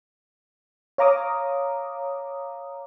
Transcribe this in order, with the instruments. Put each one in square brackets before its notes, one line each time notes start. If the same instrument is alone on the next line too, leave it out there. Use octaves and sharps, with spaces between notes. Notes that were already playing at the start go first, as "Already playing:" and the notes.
[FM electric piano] C#5 F5 A#5 D6 D#6